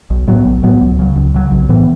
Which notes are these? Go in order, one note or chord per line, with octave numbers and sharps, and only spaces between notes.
B1
A2 F#3 B3
B1
A2 F#3 B3
C#2
C#3 F#3
C#2
C#3 F#3
B1
A2 E3 B3